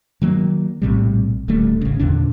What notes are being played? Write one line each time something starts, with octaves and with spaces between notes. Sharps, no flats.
D#3 F#3 A3 A#3
A#1 A2 C3 G3
D1 D2 G3 A3
G#1 C#3
E2 A#2 D3 D4